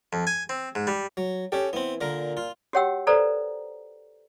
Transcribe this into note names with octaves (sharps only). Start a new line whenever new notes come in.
F2
G#5
C4
G#2
G3
F#3
C#4 G4 A4
E3 B3 C4
A#2 D3 A#4
F4
F#4 G4 C#5 F#5 G5 E6
A4 B4 C5 D5 A#5